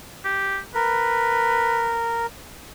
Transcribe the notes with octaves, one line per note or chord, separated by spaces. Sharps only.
G4
A#4 B4